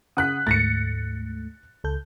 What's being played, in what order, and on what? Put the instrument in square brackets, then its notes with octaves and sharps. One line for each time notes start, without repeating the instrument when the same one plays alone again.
[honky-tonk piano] C#3 F#6 B6 [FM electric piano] F#5 D#6
[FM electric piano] D2 G#2 A3 [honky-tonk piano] A6 A#6 C#7
[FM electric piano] C#2 A4 G6